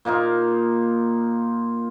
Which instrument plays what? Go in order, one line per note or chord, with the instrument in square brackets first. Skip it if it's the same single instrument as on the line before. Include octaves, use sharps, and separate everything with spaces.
[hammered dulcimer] A#2 A#3 D#4 F4